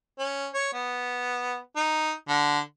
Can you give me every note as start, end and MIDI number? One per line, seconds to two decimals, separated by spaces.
0.19 0.48 61
0.54 0.72 73
0.73 1.58 59
1.76 2.13 63
2.29 2.59 50